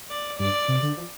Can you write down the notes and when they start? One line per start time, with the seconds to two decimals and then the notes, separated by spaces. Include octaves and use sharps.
0.10 D5
0.39 G2 D5
0.68 C3
0.82 D3
0.97 F3